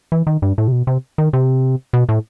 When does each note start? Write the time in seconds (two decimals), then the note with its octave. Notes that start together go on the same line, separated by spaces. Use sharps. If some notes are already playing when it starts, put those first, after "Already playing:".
0.12 E3
0.27 D#3
0.42 G2
0.58 A2
0.68 C3
0.72 B2
0.87 C3
1.18 D#3
1.33 C3
1.93 B2
2.09 A2